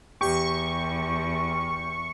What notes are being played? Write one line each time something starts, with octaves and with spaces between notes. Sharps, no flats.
E2 G4 C#6